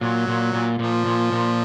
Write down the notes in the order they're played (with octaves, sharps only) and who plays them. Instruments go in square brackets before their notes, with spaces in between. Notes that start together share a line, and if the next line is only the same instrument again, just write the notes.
[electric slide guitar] A#2 [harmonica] F#3
[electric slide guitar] A#2
A#2
[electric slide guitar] A#2 [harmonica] F3
[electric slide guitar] A#2
A#2